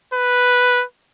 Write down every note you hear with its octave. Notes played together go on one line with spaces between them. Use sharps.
B4